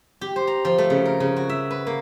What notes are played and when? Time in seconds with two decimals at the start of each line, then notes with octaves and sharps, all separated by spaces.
0.21 G4
0.36 C5
0.47 A#5
0.65 F3
0.78 A3
0.90 C#3
1.05 A#4
1.20 C#3
1.36 F#4
1.49 E5
1.71 B4
1.87 A#3